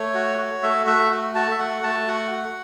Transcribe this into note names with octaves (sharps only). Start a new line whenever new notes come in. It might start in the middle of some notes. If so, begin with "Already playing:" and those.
Already playing: A3 C#5
F#4
F#4
A3 E5
A3 E5
F#4
F#4 A5
E5
A3 F#5
A3 A5
F#4 F#5
F#4